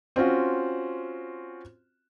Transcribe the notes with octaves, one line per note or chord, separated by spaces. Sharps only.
C4 C#4 F4 F#4